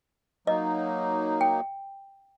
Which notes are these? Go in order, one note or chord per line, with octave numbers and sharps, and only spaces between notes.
F#3 A#3 D#4 D#5
G5